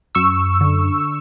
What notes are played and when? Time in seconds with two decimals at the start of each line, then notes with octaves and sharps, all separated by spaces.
0.15 F#2 C#6 E6
0.61 D3